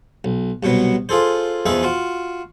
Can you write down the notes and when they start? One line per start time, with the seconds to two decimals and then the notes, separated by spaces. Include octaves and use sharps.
0.24 B1
0.63 C2 B2 F#3 B3
1.09 F4 G#4 A4 C5
1.66 E2 F3 D#4 G#4 B4 E5
1.83 F4 F#4